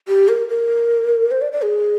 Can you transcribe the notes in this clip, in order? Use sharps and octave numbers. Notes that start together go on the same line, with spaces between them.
G4
A#4
A#4
C5
D5
D5
G#4